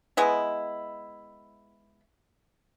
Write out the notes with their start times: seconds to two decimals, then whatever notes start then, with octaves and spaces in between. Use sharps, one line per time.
0.17 G#3 B3 E4